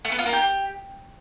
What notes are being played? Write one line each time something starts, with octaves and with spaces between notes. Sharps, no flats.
A3
B3
F4
A#3
G4